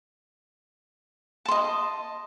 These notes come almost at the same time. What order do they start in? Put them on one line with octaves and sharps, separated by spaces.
A5 C6 D#5